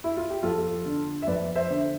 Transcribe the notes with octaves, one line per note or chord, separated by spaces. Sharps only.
E4
F4
G4
F2 F4 A4
D3
E5
F2 B4 D5
C5 E5
D3